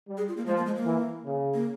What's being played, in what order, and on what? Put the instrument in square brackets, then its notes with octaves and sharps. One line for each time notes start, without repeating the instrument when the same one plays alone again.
[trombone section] G3
[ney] G#4
F4
A#3
[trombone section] F3 [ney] G#3
[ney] A#3
G#3
A#3
[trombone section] E3
C#3
[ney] A#3